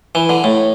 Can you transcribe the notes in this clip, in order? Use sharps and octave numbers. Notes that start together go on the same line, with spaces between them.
E3
D3
A2